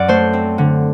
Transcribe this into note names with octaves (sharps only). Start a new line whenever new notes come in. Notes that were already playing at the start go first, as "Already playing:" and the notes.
Already playing: F#2 F#3 D5 F#5
A3 C5
C4
D3